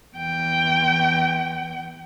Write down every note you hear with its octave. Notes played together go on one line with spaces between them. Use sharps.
E2 G5